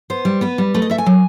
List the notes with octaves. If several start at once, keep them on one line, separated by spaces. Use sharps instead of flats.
B3 C5
G3
B3 B4
G3
A3 B4
D#5
A3 E5
G#5
F#3